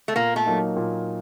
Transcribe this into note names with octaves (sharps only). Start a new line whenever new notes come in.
A3
A#2 A#3
A3
F#3 A#3 D#4
A#2